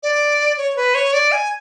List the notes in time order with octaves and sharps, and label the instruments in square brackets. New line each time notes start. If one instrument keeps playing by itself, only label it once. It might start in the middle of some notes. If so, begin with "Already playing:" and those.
[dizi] D5
C#5
B4
C#5
D5
G#5